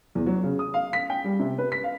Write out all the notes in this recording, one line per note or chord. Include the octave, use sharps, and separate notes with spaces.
E2
F#3
C#3
D#6
F5
B6
G5
G3
C3
B4
B6
F5